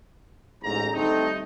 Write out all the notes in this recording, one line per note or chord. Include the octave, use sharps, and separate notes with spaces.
A1 E2 G#2 A#5
D2 G3 A3 C4 D#4